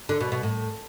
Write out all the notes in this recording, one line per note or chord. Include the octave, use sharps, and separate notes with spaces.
D3
B2
B2
A2